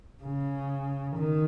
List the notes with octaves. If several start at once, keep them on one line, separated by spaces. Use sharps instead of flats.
C#3
D#3